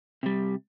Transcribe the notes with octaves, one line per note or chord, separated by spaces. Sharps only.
C3 G3